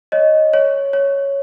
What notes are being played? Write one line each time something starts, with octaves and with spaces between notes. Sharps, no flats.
C#5 D#5
C#5
C#5